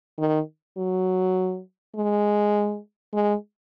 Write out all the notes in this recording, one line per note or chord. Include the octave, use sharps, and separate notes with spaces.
D#3
F#3
G#3
G#3